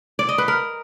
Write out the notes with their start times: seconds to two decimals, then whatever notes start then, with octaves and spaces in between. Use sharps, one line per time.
0.19 D5
0.29 D#5
0.38 B4
0.48 A#4